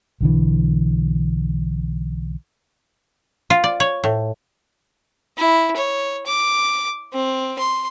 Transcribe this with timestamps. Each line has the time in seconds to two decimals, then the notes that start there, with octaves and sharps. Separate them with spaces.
0.21 B1 D3 E3
3.50 F4
3.64 D5
3.80 C#5
4.04 A2
5.38 E4
5.77 C#5
6.27 D6
7.13 C4
7.58 C6